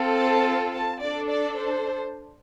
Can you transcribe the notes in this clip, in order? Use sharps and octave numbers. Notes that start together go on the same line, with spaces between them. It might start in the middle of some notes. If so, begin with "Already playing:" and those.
Already playing: C4 F4 A4
A5
A5
D4 A4 D5
D5
C5